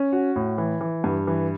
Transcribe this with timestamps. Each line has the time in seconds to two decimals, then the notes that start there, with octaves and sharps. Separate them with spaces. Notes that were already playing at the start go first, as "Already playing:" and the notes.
Already playing: C#4
0.13 F#4
0.36 A2
0.58 E3
0.81 E3
1.04 G2
1.27 E3